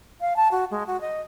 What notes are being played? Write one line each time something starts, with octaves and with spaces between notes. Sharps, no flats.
F5
A5
F#4
G#3
F#4
D#5